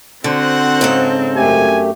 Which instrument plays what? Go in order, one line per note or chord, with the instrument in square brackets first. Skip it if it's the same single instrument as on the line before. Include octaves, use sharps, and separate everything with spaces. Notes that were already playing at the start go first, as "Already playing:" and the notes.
[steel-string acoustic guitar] D3 [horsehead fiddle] C4 [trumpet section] F#4 C5 F#5
[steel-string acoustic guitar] G#2 C#3 A4
[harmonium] F#2 A3 G4 [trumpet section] G#5